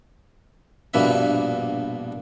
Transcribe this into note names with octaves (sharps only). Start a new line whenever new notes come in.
A#1 G2 B2 A#3 B4 E5